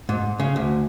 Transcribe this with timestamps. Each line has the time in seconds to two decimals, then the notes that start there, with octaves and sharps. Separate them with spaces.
0.09 G#2
0.40 C#3
0.56 D2